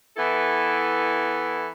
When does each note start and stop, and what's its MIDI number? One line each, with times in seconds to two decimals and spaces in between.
0.17 1.67 52
0.17 1.67 59
0.17 1.67 64
0.17 1.67 69